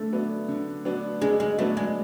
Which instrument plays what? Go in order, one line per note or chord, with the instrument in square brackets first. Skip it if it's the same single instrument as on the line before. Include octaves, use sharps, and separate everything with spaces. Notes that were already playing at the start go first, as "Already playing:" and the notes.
Already playing: [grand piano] D3 [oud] A3
[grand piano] F#3 B3 D4
D3
F#3 B3 D4
[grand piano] D3 [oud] G#3
[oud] G#3
[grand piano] F#3 B3 D4 [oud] A3
[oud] G#3